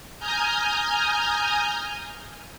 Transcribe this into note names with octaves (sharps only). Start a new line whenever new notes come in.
G#5 A#5 D#6 F6 G6